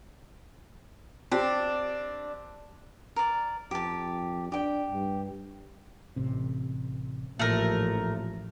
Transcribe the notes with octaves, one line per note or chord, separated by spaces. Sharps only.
C4 D4 G4
A#4 D5
F2 G4 A5
D4 G4 G5
G2
A1 C3
A1 A#2 F3 A3 A#4